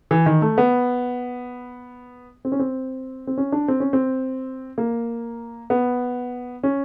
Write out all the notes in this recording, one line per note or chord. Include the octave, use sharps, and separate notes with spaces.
E3
D#3
A3
B3
C4
C#4
C4
C4
C#4
D4
C4
C#4
C4
A#3
B3
C#4